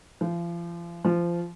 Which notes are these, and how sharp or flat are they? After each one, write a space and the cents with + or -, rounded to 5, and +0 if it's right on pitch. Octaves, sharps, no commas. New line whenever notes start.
F3 -40
F3 -25